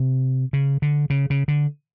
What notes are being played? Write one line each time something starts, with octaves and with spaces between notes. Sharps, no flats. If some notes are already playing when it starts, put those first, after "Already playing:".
Already playing: C3
C#3
D3
C#3
C#3
D3